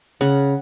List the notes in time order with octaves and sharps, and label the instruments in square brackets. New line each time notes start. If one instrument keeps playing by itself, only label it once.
[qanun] C#3 F#5